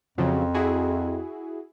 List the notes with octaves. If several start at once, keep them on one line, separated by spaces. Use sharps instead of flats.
F2 C#3 F3 F#3
E4 F#4 G#4